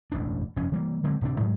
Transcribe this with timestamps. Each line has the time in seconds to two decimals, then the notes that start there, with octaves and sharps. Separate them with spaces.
0.12 E1 A1 F#2 D4
0.56 F1 G2 F3 C#4
0.72 E3 G3 A#3
1.04 D3 F#3 G#3 C4
1.21 D1 C3 C4 D4
1.40 G#2 F#3 G#3